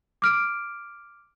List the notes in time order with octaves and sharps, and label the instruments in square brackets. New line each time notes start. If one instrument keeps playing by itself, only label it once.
[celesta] D6 F6 D7